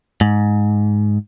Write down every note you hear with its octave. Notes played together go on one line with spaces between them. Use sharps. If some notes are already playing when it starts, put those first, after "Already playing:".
G#2